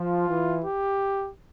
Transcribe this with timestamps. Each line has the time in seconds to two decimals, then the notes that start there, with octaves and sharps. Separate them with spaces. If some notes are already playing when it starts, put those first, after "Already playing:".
Already playing: F3 F4
0.29 E3
0.65 G4